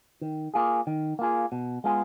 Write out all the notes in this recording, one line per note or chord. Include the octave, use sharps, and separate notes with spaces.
D#3
A#3 F4 G#4
D#3
A#3 F4 G#4
B2
G#3 B3 F4 G#4